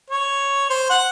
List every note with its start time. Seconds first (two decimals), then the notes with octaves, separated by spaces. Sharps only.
0.10 C#5
0.70 C5
0.90 F#5